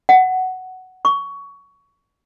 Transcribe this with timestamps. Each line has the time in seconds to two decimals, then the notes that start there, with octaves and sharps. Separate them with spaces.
0.09 F#5
1.05 C#6